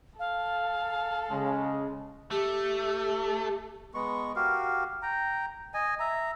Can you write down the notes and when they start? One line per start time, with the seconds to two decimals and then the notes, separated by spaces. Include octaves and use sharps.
0.19 A4 F5
1.30 C#3 G#3
2.31 A3 G4
3.94 G#3 B3 C#6
4.36 F#4 G4 A#4 F5
5.02 G5 A#5
5.74 D#5 G#5
6.00 E5 A#5